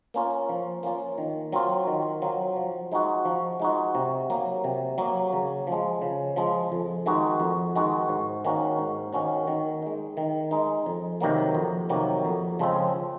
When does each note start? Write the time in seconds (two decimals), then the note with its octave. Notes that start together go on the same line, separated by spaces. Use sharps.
0.14 A#3 C#4 F4
0.49 F3
0.83 A#3 C#4 F4
1.18 D#3
1.52 F#3 C4 F4
1.87 D#3
2.22 F#3 C4 F4
2.56 F3
2.92 G#3 D#4 F#4
3.25 F3
3.60 G#3 D#4 F#4
3.95 C3
4.30 F#3 A#3
4.64 C3
4.98 F#3 A#3
5.33 C#3
5.67 F3 G#3
6.02 C#3
6.36 F3 G#3
6.72 F2
7.06 D#3 G#3 D#4 F#4
7.40 F2
7.76 D#3 G#3 D#4 F#4
8.09 G#2
8.45 D#3 A#3 C#4 F#4
8.79 G#2
9.13 D#3 A#3 C#4 F#4
9.47 D#3
9.82 G#3 D#4
10.17 D#3
10.51 G#3 D#4
10.86 F2
11.20 C3 D#3 F#3 A#3
11.55 F2
11.89 C3 D#3 F#3 A#3
12.25 F2
12.59 C#3 F3 G#3 C4